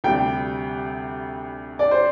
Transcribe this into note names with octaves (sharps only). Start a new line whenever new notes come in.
D2 C3 G3 G5
D5
C5